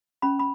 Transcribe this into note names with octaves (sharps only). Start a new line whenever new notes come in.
C#4 B5
B5